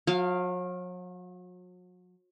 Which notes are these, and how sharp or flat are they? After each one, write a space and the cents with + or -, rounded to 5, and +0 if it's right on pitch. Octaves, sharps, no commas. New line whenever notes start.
F#3 -40 F5 +0